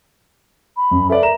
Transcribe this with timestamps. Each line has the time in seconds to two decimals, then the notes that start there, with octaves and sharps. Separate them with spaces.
0.76 B5
0.91 F#2
1.09 A4 B4 D5 E5
1.22 A#4 A#5 E7